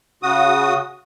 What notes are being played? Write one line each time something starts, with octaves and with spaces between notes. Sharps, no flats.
C#3 F#4 D#6